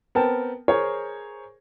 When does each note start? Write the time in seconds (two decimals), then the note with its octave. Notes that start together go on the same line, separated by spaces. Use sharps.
0.15 B3 C4 A#4 G5 A5
0.68 G#4 A#4 C5 C#5